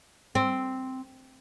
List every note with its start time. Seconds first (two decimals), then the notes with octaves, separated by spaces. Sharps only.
0.35 C4